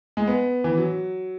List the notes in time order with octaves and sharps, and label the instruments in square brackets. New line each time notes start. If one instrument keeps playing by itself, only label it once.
[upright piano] G#3
B3
E3
F#3